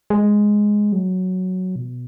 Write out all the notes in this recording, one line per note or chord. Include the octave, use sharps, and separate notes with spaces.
G#3
F#3
B2